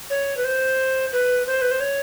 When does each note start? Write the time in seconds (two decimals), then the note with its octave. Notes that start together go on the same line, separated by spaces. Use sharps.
0.10 C#5
0.37 B4
0.45 C5
1.12 B4
1.47 C5
1.62 B4
1.71 C5
1.80 C#5